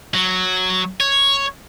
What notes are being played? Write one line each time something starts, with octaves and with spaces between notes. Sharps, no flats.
F#3
C#5